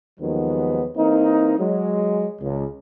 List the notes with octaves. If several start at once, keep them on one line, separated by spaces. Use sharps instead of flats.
D#2 D#3 F3 F#3 G#3 B3
E3 A#3 C4 D#4
F#3 G#3
C#2